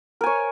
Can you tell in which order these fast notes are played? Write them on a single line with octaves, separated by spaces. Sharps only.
A#4 G#5 C#5